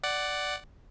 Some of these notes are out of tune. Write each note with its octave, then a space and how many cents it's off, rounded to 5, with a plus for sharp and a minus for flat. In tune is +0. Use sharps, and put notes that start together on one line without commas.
D5 +0 F#5 +15